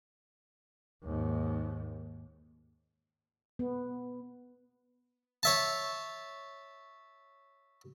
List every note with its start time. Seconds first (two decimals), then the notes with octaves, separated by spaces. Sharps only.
1.03 D#2 G#2
3.59 B3
5.43 C#5 E5 A5